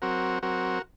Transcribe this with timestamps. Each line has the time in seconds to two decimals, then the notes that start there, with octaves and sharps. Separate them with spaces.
0.02 F#3 C4 F#4 A#4
0.42 F#3 C4 F#4 A#4